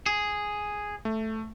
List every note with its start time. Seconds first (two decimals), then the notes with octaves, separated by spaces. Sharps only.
0.06 G#4
1.05 A3